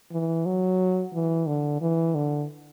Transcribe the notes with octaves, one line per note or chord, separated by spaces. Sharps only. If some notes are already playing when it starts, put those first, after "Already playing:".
E3
F#3
E3
D3
E3
D3